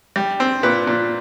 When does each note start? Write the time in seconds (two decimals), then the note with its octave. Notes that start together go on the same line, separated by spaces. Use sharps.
0.16 G3
0.40 C4
0.63 A#2 B4
0.87 A#2